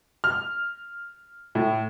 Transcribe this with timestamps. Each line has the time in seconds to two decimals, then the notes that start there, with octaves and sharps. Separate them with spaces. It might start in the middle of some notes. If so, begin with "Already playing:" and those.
0.24 F6
1.55 A2